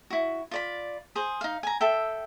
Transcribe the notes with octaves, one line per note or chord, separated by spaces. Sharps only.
E4 F#4
F4 D5 B5
G#4 C5
D#4 F5
G#5 A#5
A4 E5 G5